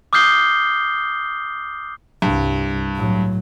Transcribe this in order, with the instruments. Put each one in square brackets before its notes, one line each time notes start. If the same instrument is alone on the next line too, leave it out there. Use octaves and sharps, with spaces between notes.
[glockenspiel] D6 D#6 F6 G6 C7 G7
[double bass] C2 [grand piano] G2
[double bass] A2 F#3